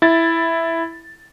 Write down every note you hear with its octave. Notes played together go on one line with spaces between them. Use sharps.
E4 A6